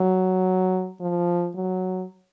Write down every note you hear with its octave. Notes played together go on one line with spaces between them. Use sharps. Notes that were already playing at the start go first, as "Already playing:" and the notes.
Already playing: F#3
F3
F#3